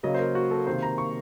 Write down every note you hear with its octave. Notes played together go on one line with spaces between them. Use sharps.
C#3 F#3 A#3 D#5
C5
A#4
F#4
A4
C3 D#3 A#3 C5
A#5
C#6